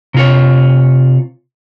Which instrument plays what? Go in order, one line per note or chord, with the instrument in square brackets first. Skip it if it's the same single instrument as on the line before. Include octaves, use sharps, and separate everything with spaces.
[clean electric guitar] C3 F4 C#5